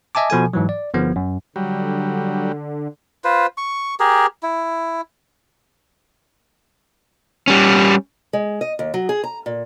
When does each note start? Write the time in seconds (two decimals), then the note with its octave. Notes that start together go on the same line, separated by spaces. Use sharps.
0.15 D#5 E5 G#5 A5 D6
0.30 B2 F3 A4 G#5
0.53 G#2 E3 F#3
0.69 D5
0.94 G1 F3 B3
1.16 F#2
1.56 D3 F#3 G3
3.24 F4 B4 C5
3.58 C#6
4.00 G4 G#4 A#4
4.43 E4
7.48 G3 C#4
8.33 G#3
8.61 D#5
8.79 D#2
8.94 F#3
9.09 G#4
9.24 A#5
9.46 A#2